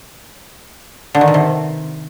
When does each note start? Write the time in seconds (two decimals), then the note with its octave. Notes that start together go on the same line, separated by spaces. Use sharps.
1.15 D3
1.21 D#3
1.28 B2
1.34 C3